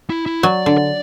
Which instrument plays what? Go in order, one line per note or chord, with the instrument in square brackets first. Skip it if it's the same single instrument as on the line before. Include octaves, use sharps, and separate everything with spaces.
[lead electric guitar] E4
E4
[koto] F#3 [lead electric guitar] D5
[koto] D3
[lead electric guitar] D5